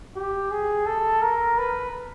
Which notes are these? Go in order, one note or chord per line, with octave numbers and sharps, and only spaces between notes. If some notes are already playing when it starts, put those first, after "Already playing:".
G4
G#4
A4
A#4
B4